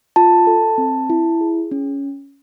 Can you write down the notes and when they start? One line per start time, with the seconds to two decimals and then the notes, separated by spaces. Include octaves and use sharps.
0.16 F4 A5
0.47 A4
0.78 C4
1.10 E4
1.41 G#4
1.71 C#4